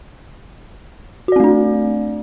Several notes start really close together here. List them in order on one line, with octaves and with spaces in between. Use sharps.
F#4 D5 C4 A3 D4